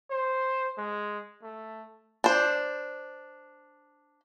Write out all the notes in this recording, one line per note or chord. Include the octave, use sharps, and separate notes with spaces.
C5
G#3
A3
D4 C5